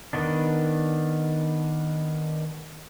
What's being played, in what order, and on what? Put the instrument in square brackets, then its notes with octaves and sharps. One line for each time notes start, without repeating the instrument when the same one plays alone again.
[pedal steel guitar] D#3 B3 D4